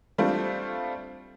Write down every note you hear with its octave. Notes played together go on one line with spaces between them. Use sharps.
G3 A3 C4 D4 F4